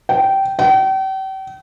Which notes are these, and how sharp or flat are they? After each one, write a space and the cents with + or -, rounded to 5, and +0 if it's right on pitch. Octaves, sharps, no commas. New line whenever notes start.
G5 -15
G5 -40